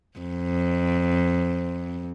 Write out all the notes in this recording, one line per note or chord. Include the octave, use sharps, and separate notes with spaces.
F2